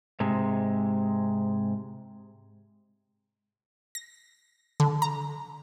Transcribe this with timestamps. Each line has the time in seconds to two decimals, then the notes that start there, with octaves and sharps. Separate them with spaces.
0.20 G#2 C3 G#3
3.95 A#6
4.80 D3
5.02 A#5